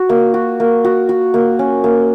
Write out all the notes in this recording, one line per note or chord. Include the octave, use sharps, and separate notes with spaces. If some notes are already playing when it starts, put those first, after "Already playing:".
Already playing: F#4
A#3
F#4
A#3
F#4
F#4
A#3
C#4
A#3